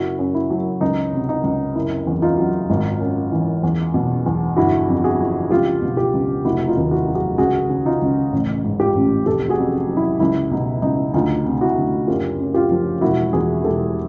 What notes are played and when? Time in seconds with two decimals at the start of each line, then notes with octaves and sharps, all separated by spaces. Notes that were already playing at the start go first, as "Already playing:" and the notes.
Already playing: F#1 E4 F#4
0.18 F#2
0.35 E4
0.50 F#3
0.81 C#2 D#4
1.13 C3
1.29 D#4
1.43 C#2
1.75 F#1 E4
2.07 E2
2.22 D#4 F4
2.38 F#3
2.70 G#1
3.00 F#2
3.32 E3
3.63 E2
3.94 B2
4.26 E2
4.56 G1 E4 F#4
4.88 F2
5.04 F#4 G#4
5.19 F3
5.50 C#2 F4 G4
5.82 B2
5.97 F4 G4
6.13 C#2
6.45 F1 E4 F#4
6.68 D#4 F4
6.77 D#2
6.91 E4 F#4
7.07 F#3
7.15 F#4 G#4
7.38 C#2 F#4 G#4
7.69 C#3
7.86 D#4 F4
8.02 C#2
8.32 A1
8.64 G#2
8.80 F4 G4
8.95 A1
9.26 F1 G4 A4
9.49 F#4 G#4
9.58 F2
9.89 F#3
9.97 E4
10.20 C#2 E4
10.51 B2 D#4
10.82 C#2 D#4
11.14 D2 D#4 F4
11.46 C3
11.61 E4 F#4
11.77 D2
12.07 F#1 F4 G4
12.39 F#2
12.54 F4 G4
12.71 F3
13.01 E1 E4 F#4
13.33 E2 F#4 G#4
13.64 E1 G4 A4